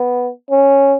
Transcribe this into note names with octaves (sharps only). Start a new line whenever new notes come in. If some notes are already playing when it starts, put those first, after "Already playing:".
Already playing: B3
C#4